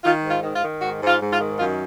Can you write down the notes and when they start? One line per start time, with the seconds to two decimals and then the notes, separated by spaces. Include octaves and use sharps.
0.04 D#3 F4
0.23 G#2
0.31 F4
0.43 D#3
0.56 F4
0.62 D#3
0.81 G#2 F#4
1.01 G#2
1.07 F4
1.20 G#2
1.33 F4
1.39 D#3
1.58 F#2 F4